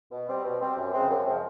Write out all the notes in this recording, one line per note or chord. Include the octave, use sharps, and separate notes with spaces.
B2
G3 C4
B2
G3 C4
F#2
C#3 F3 G#3 C4
F#2
C#3 F3 G#3 C4